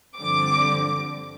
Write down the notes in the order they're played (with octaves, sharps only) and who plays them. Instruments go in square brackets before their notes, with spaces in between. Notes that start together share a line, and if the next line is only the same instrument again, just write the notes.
[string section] G2 D3 F3 C4 D6